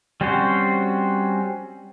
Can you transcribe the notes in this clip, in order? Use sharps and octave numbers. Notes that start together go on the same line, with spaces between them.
G3 C4 C#4 F#4 C5